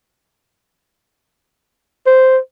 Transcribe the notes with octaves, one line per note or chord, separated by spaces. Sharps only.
C5